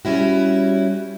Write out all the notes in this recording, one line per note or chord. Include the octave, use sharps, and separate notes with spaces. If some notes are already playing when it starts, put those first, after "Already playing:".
G3 C#4 E4 F#4